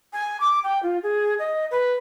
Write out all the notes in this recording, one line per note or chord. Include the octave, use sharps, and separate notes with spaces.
G#5
D6
G5
F4
G#4
D#5
B4